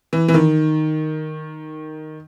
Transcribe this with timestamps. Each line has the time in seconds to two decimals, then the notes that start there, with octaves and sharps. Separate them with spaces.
0.13 E3
0.28 E3
0.34 D#3